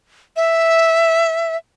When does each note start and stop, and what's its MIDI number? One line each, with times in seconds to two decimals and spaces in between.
0.36 1.57 76